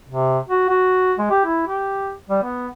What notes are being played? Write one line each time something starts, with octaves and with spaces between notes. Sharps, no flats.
C3
F#4
F#4
G#3
G4
E4
G4
G3
B3